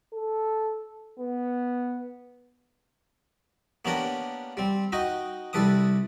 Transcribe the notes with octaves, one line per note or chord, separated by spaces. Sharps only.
A4
B3
A#3 B3 C#4 D4 G4 A#4
G3 C4
D#4 F#4 D#5 G5
C2 G3 A4 B4 D6 D#6